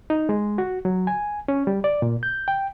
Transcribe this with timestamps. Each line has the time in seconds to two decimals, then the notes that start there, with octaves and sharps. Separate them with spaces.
0.10 D#4
0.29 G#3
0.58 F#4
0.85 F#3
1.07 G#5
1.48 C#4
1.67 G3
1.84 D5
2.02 A#2
2.23 G6
2.48 G5